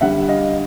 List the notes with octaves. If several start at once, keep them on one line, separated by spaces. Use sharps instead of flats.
D3 G3 E5 F#5
D#5 F5